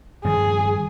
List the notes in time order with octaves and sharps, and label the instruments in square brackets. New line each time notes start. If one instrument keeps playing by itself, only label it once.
[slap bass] G2 D#3 F3 [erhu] G#4